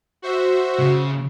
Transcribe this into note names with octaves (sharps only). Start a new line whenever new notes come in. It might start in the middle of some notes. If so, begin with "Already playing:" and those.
F#4 C5 E5
C#3